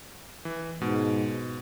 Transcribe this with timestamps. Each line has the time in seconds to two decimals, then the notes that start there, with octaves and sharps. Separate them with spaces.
0.45 E3
0.81 G#2 B2 G#3